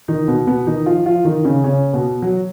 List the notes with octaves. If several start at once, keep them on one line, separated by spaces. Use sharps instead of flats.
D#3 D#4
B2 B3
B2 B3
D#3 D#4
F3 F4
F3 F4
D#3 D#4
C#3 C#4
C#3 C#4
B2 B3
F#3 F#4